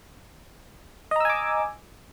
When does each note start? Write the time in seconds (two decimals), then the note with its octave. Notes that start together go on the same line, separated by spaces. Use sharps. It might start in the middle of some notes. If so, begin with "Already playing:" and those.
1.11 D#5
1.16 A#5
1.20 E6
1.25 G#5
1.30 D6